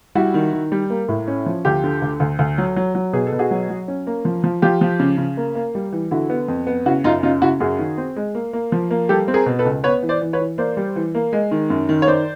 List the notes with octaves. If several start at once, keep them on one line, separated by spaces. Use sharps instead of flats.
G3 E4 F#4
D#3
D#3
G3
A#3
A2
C#4
F3
D2 F4 G4
D3
D2
D2
D2
F#3
F#3
F#3
B2 G#4
A4
B2
F#4 G#4
F#3
F#3
C#4
A#3
F3
F3
F3 F4 G4
F3
C#3
C#3
A#3
A#3
G3
E3
D3 E4 F#4
B3
F2
B3
C#3 E4 F#4
F#2 D#4 F4
C#3 D#4 F4
C#3 E4 F#4
F#2 F#4 G#4
D#3
C4
G#3
A#3
A#3
F3
A#3
G3 G4 A4
C4
G#4 A#4
B2
A4 B4
C#2
B3 B4 C#5
E3
C5 D5
E3
B4 C#5
E3
A#3 C5 D5
G3
E3
A#3
G#3
D#3
F#2
D#3
C#5
D#3 C5 D5